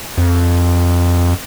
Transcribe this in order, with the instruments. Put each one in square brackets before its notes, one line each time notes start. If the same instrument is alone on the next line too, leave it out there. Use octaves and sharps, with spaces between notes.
[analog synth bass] F2